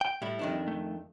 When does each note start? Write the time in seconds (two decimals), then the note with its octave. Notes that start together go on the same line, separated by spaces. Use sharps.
0.01 G5
0.22 A2 G3 E4
0.39 F2 D#3 D4
0.68 A3